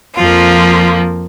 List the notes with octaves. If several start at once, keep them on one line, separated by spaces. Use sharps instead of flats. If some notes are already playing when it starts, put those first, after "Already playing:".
F2 F3 A#3 F4